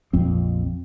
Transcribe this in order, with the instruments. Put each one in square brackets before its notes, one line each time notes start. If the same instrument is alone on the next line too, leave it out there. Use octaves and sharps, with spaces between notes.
[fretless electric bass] A#1 F2 C4